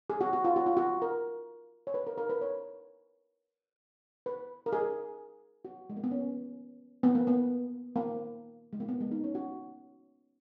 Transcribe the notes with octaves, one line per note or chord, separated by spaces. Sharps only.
G#4
F#4
F#4
F4
F#4
F4
F#4
A#4
C#5
B4
A#4
A#4
B4
C#5
B4
A#4
G#4
F#4
G#3
A#3
B3
C#4
B3
A#3
B3
A#3
G#3
A#3
B3
G#3
D#4
C#4
F#4